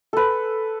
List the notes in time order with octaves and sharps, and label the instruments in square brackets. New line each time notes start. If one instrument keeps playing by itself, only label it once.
[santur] A4 B4